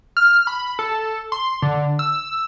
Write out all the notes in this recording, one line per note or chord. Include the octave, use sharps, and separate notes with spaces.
F6
B5
A4
C6
D3
E6